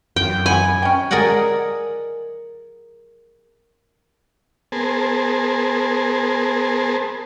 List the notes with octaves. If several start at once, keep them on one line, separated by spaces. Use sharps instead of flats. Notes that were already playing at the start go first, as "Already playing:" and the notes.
F#2 G5
F#5 G#5 B5
C#4 G5
G#4 A#4 D5 D#5 F#5
B3 G#4 A#4 C5 A5